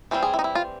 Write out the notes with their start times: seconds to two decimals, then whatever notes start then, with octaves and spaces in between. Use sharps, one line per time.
0.11 E3 G3 C4 C5
0.23 G#4
0.34 E4
0.39 D#4
0.44 E4
0.55 F4